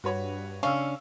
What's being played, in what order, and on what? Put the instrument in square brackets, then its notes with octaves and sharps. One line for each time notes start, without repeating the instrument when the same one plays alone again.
[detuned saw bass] G2 [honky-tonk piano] F#4 B4 C#5
[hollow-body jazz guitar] C#3 D4 [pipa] C#4 [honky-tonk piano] F5 E6